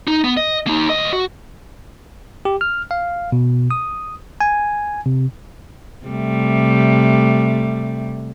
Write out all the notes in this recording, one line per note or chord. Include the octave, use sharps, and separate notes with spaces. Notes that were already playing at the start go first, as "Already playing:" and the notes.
D#4
B3
D#5
A#3 D#4
D2 D#5
F#4
G4
F6
F5
B2
D#6
G#5
C3
C3 G3 A3